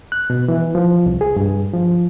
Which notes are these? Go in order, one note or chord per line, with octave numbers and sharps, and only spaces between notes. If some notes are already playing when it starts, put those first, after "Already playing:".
F#6
B2
E3
F3
C2
G#4
G2
F3